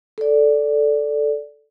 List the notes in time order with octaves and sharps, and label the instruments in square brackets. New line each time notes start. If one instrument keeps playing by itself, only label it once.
[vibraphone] A4 D5